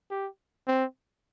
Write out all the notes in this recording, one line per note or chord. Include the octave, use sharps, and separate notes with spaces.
G4
C4